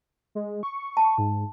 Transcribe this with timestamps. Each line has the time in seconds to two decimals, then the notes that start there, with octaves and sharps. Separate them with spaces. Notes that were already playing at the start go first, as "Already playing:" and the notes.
0.35 G#3
0.63 C#6
0.97 A5
1.18 G#2